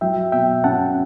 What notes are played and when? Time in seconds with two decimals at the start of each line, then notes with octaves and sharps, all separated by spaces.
0.01 F#3 E5 G5
0.32 B2 E5 G5
0.64 C#4 F#5 A5